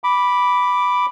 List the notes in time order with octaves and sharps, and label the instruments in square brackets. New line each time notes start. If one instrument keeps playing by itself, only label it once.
[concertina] B5 D6